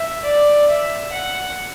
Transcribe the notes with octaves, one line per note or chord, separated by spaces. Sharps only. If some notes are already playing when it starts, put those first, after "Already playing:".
Already playing: E5
D5
E5
F#5